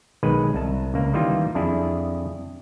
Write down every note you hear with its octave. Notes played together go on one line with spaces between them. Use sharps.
B1 D#3 G#3 B4
C2 A5
C#2 A#3
D#3 E3 G3 A#3 F4
F2 D4 E4 G#4